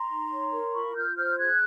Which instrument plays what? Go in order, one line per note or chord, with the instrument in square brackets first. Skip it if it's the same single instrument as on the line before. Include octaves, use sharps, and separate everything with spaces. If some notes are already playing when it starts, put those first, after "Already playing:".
Already playing: [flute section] A#5 C6
D#4
C#5
A#4
F4 B5 C#6
F4 F6 G6
C5 F6 G6
G#4 F#6 G#6